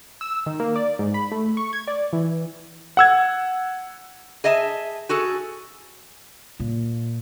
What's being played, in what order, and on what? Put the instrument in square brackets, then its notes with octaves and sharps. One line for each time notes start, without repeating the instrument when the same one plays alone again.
[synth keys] E6
D#3
A#3
D5
G#2
B5
A3
C#6
G#6
D5
E3
[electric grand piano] F#5 E6 G#6
[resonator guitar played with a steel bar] G#4 D#5 E5 A5
F#4 G#4 A4
[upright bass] A#2